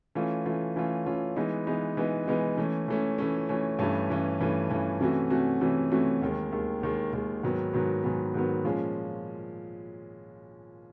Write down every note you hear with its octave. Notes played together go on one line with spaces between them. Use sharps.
E3 A3 C#4 F4
E3 A3 C#4 F4
E3 A3 C#4 F4
E3 A3 C#4 F4
E3 G#3 B3 D#4
E3 G#3 B3 D#4
E3 G#3 B3 D#4
E3 G#3 B3 D#4
E3 A3 C#4
E3 A3 C#4
E3 A3 C#4
E3 A3 C#4
G2 E3 A3 C#4
G2 E3 A3 C#4
G2 E3 A3 C#4
G2 E3 A3 C#4
C3 E3 A3 C#4 F#4
C3 E3 A3 C#4 F#4
C3 E3 A3 C#4 F#4
C3 E3 A3 C#4 F#4
D#2 D#3 G#3
D#2 D#3 G#3
D#2 D#3 G#3
D#2 D#3 G#3
G#2 D#3 F#3 B3
G#2 D#3 F#3 B3
G#2 D#3 F#3 B3
G#2 D#3 F#3 B3
A#2 F3 G#3 C#4